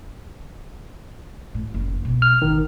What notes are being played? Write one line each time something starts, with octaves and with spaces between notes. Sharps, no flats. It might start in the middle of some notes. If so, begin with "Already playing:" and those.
A2
F#1 E2
B1 B2
F6
A1 D#3